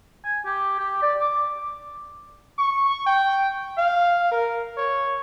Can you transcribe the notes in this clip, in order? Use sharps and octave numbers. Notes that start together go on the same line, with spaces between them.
G#5
G4
G4
D5
D6
C#6
G5
F5
A#4
C#5